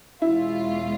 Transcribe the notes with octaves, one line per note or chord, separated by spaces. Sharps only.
E2 B2 G#3 C#4 E4 F4